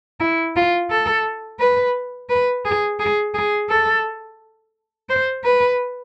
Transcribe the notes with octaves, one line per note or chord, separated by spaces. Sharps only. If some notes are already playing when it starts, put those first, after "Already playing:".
E4
F4
A4
B4
B4
G#4
G#4
G#4
A4
C5
B4